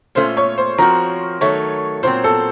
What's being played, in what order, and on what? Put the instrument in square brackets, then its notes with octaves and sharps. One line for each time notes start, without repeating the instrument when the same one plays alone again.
[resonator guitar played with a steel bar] A#2 A3 C#4 F4 [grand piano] C5
[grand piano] C#5
C5
[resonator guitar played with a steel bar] F3 C4 F#4 [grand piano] A#4
[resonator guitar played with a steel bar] D#3 F#3 A3 [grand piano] C#5
[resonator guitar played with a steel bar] A#2 F#3 C4 [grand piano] C5
[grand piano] A4